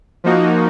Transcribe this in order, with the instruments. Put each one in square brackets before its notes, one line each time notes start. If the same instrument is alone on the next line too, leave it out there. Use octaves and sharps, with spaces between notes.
[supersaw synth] F3 A#3 D#4 F#4